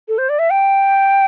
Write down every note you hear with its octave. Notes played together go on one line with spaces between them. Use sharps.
A4
C5
D5
E5
G5